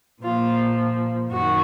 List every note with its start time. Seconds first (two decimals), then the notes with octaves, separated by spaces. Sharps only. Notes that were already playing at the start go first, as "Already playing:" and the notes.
0.22 A#2 F3 F4
1.31 F#2 D#3 F#4